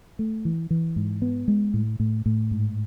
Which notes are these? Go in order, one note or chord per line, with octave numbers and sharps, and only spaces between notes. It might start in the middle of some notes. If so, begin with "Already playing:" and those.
A3
E3
E3
G#2
B3
G#3
A2
A2
A2
G#2